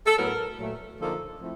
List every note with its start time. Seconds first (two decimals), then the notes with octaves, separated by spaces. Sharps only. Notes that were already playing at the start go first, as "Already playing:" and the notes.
0.05 A4
0.17 A2 F#3 B3 A#4
0.58 A#2 F#3 A3
0.98 D3 F3 A#3 D#4 A4
1.40 F3 A3 C4 E4